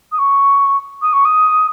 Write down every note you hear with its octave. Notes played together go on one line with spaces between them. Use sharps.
D#6
C#6
D#6
C#6
D#6